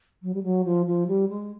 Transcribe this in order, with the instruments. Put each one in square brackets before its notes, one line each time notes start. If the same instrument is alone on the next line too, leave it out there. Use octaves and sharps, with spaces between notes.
[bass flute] F#3
G3
F#3
F3
F3
G3
G#3